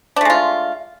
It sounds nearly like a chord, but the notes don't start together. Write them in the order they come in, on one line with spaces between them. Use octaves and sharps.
D4 A3 G#3 F4